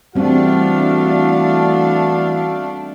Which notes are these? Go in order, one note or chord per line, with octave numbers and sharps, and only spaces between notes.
E3 G3 A3 C4 D4 E4 F#4 F5